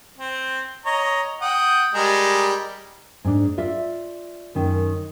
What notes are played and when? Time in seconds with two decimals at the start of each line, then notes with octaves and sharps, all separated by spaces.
0.18 C4
0.86 C#5 D#5 A#5
1.42 F#5 G5 D#6
1.94 G3 G#3 A#4
3.25 G#2 D4
3.58 F4 D5 E5
4.55 F#2 D#3 C#4